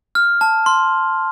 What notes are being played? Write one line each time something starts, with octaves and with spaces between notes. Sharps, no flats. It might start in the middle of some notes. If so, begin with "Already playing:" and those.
F6
A5
C6